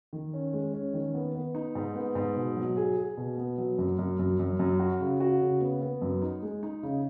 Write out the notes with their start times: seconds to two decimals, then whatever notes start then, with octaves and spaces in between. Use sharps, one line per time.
0.13 D#3
0.34 C#4
0.54 G#3
0.74 C#4
0.94 D#3
1.14 B3
1.35 B3
1.55 D#4
1.75 G#2
1.95 B3
2.15 G#2
2.36 B2
2.56 F#3
2.77 G#4
2.97 G#4
3.17 B2
3.37 B3
3.58 F#3
3.78 F#2
3.99 F#2
4.19 F#2
4.39 F#2
4.59 F#2
4.80 F#4
5.00 C#3
5.20 F#4
5.41 C#3
5.61 B3
5.82 B3
6.02 F#2
6.22 D#4
6.43 G#3
6.63 D#4
6.83 C#3